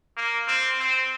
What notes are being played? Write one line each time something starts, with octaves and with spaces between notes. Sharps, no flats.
A#3
C4
C4